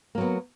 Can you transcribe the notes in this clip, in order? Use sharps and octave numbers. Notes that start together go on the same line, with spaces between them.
F#3 A#3 B3